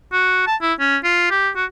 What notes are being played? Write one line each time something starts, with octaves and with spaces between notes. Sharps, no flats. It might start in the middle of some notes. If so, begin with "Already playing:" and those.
F#4
A5
E4
C#4
F4
G4
F#4